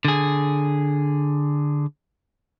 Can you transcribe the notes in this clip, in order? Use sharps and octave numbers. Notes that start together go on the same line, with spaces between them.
D3 G#4